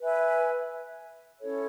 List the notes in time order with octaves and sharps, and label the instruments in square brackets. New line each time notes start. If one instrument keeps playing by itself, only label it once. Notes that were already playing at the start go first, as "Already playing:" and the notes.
[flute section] B4 E5 G#5
C#4 E4 A4 C#5